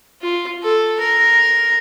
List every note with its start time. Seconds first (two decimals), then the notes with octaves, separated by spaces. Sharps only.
0.22 F4
0.63 A4
1.00 A#4